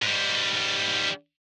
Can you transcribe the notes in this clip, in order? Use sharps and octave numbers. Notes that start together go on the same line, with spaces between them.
G#2 G3